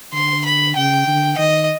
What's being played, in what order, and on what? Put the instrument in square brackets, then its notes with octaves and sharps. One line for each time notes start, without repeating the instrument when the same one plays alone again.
[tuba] D3 [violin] C6
[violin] B5
[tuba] C#3 [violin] G5
[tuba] D3
[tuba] D#3 [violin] D#5